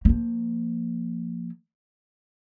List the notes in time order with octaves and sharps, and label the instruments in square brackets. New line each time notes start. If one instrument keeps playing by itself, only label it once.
[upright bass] F3 A#3